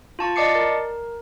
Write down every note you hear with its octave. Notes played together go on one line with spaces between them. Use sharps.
F4 A5 C#6
D5 D#5 A5 D6 C7 C#7
A#4